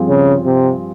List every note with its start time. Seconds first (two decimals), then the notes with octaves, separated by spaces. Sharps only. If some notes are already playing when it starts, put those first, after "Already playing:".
Already playing: G2 F3 C4 F4 G#4
0.09 C#3
0.46 C3